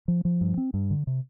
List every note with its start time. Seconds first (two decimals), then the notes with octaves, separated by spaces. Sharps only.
0.08 F3
0.25 F3
0.41 G2
0.58 C4
0.74 G2
0.91 D3
1.07 C3